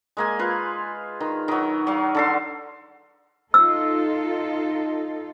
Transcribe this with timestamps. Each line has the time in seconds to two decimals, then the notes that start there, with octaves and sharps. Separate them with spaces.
0.17 G#3 A#3 G#5
0.39 F4 B4
1.20 D#3
1.48 D#3 F#3
1.87 F#3 F5
2.15 D3 A4 C6
3.54 D#4 F4 A4 E6